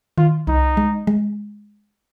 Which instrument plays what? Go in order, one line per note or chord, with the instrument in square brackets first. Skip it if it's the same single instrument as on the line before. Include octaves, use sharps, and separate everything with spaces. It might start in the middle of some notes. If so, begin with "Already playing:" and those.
[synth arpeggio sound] D#3 [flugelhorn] F4
[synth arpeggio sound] C2 [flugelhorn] D#4
[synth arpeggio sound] G#3
G#3